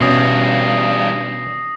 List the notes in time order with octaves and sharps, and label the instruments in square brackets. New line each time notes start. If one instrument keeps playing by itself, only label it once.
[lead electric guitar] E2 G2 [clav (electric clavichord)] B2 C#4 [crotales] D#6 A#6 C7